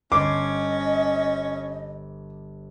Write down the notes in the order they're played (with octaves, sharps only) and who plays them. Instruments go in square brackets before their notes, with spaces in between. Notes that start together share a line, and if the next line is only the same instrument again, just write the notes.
[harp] G1 C5 C7 [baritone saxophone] C#4 [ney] D#5 [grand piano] D6